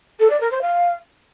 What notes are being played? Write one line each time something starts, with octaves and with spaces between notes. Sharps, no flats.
A4
D5
A#4
C5
F5